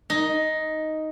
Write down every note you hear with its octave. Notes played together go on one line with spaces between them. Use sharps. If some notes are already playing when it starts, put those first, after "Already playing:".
D#4